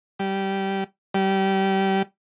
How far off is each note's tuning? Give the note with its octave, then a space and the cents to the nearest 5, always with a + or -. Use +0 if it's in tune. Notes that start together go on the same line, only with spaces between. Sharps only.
G3 -15
G3 -25